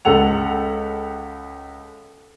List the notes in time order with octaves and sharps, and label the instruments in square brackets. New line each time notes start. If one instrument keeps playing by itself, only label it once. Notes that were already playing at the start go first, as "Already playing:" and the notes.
[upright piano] C#2 G#3 A4 F#5 F7